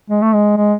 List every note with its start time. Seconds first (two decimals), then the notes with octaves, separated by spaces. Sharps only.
0.10 G#3
0.22 A3
0.33 G#3
0.57 G#3